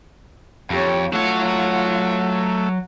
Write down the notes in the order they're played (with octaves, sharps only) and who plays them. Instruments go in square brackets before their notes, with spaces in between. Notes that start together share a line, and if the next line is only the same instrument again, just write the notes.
[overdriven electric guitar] F2 [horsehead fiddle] G4 C#5
[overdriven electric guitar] F#3 C#5 [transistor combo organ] A3 [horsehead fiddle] F4 F#5